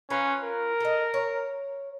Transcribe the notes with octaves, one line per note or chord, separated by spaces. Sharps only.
C#4 F4 B4 A#5
A#4
A4 D#5
C#5